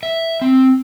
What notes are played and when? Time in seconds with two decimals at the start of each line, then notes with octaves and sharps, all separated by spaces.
0.03 E5
0.41 C4